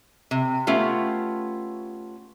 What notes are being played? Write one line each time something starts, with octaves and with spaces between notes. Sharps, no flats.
C3
A3 B3 C#4 F4 G4